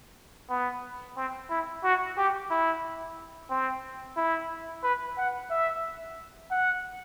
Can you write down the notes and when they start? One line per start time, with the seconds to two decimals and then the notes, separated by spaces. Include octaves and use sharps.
0.50 B3
1.16 C4
1.50 E4
1.83 F#4
2.17 G4
2.50 E4
3.50 C4
4.17 E4
4.83 B4
5.17 F#5
5.50 E5
6.51 F#5